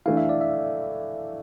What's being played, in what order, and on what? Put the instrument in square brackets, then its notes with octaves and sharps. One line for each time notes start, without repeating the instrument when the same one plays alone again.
[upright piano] E3 A3 D4 [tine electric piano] F5
[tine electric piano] E5
D5
E5